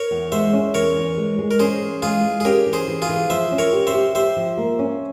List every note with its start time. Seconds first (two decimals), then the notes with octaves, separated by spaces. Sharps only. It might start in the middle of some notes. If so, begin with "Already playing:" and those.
Already playing: A#4 C#5
0.11 E2
0.32 G#3 C5 E5
0.53 C#4
0.74 E2 A#4 C#5
0.95 E3
1.17 G#3
1.39 G#3
1.51 A#4
1.59 C#4 G#4 C5
1.81 E3
2.02 G#3 F4 G#4
2.24 G#3
2.40 G#4
2.45 C#4 G4 A#4
2.66 E3
2.73 G#4 C5
2.88 E3
3.02 F4 G#4
3.09 E3
3.30 F3 C5 E5
3.52 C#4
3.58 A#4 C#5
3.73 G4
3.87 C5 E5
3.94 G4
4.15 G4 C5 E5
4.37 F3
4.58 A#3
4.79 C#4